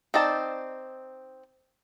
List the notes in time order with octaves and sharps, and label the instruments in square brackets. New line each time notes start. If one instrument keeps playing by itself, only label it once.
[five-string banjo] C4 D#4 D5 A5